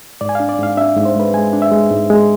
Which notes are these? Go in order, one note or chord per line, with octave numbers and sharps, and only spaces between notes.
G#2 D5
G#5
D4 F5
D5
G#2 F5
D4 E5
G#2
C5
G#3 B4
G#3 G#5
D4
E5
G#3
G#2
G#3